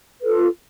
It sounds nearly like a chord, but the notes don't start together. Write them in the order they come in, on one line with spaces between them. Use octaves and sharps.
B4 A4 F4